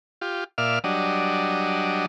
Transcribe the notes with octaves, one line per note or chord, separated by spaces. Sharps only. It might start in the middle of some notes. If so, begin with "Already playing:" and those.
F4 G4
A#2 D5 E5 F5 F6
F#3 G3 D4 D#5